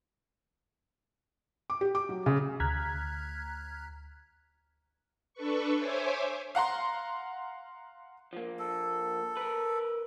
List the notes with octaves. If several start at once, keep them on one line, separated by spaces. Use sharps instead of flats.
D6
G4
D6
F#3
C#3
D2 A#5 F6 F#6 G#6 B6
D4 A4 B4 C#6
C5 C#5 E5 G#5 D6
F5 F#5 A#5 C6
F3 A#3
A4
A#4 B4